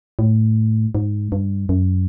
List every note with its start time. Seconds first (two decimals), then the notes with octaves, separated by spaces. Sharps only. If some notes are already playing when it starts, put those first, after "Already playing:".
0.19 A2
0.95 G#2
1.32 G2
1.69 F#2